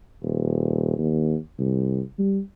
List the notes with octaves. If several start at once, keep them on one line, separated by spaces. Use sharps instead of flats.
D#1
D#2
C2
G3